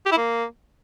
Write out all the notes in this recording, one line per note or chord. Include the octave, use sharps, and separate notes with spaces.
G4
E4
A#3